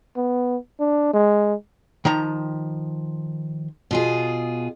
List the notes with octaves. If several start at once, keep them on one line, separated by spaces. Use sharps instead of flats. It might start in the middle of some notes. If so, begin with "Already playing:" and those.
B3
D4
G#3
D#3 F3 A#5
B2 F4 G#4